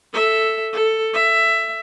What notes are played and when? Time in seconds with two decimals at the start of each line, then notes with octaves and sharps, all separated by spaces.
0.13 A4 E5
0.73 A4
1.14 E5